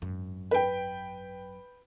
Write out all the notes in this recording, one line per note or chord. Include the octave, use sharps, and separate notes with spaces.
G#1 F#2
B4 G5